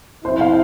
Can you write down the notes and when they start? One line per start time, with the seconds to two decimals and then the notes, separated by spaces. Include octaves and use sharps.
0.24 F3 C4 E4 C5
0.41 F5